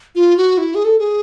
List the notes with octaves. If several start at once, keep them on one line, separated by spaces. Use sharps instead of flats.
F4
F#4
E4
G#4
A4
G#4